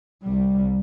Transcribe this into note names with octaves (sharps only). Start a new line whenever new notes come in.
C2 G3